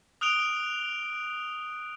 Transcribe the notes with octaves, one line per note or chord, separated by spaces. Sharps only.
D#6 F6 F#6 D7 F7 G7